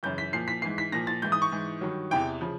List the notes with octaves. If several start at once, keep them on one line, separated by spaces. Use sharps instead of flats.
F#2 C#3 E3 G6
B6
A#2 F3 C7
B6
G#2 E3 C7
B6
A#2 F3 A#6
A6
G#2 E3 G6
D#6
C#6
G#2 E3
G2 D#3 F#3
E2 C3 E3 G5
C#3 F3